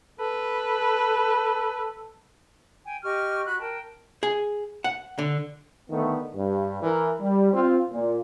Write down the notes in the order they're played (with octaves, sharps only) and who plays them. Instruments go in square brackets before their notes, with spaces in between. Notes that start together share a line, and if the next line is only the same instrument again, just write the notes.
[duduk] A4 [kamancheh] B4
[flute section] G5 G#5
G4 D#5 C#6 F6
F#4 B5 F#6
A#4 G5 A5
[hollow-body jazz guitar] G#4
F#5
D3
[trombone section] D3 D#3 A3 B3
G2
E3 A#4
G3
C4 F4
A#2